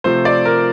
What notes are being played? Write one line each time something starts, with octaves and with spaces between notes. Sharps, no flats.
C3 F3 A3 C5
D5
A#4